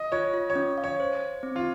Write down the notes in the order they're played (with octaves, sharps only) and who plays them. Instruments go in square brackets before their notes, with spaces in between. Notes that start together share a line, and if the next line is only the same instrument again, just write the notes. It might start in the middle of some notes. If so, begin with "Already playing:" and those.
Already playing: [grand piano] D#5
[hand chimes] F4 [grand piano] C#5
[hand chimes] F4
[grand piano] C#5
[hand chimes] C#4
F5
[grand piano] C#5
[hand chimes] C5
C5
C4
[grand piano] F4